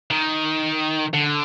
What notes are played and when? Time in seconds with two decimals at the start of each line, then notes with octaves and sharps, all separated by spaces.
0.11 D#3
1.14 D3